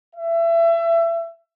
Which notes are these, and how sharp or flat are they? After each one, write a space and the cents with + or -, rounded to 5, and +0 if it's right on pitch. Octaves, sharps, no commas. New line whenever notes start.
E5 +25